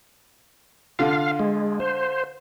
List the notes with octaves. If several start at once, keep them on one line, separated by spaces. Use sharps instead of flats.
D3 F4 F5
G#3
C5